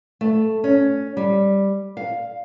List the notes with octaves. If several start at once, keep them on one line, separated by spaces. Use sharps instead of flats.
A3
C#4
G3
F5